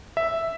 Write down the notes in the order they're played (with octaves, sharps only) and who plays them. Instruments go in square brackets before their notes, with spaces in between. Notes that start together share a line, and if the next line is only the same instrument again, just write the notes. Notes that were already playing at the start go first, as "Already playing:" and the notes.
[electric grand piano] E5